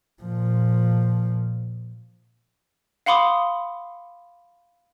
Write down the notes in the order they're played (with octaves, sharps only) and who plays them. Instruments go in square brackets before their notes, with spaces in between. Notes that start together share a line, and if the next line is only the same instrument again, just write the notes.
[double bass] A#2 F3
[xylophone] F5 F#5 B5 C6 D6 D#6